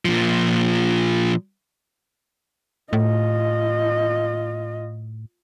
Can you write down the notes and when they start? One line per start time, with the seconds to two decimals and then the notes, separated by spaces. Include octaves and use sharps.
0.05 A#2 F3
2.93 A2 F4 D#5